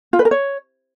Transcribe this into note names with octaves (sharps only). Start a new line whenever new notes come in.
F4
B4
A#4
C#5